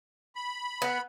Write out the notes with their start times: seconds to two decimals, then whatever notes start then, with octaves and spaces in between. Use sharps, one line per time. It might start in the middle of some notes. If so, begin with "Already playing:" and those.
0.36 B5
0.82 B3